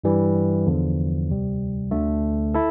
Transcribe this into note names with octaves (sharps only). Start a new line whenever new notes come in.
G2 E3 G3
E2 D3 F3
D2 C3 G3
D2 D3 A3
E4 A4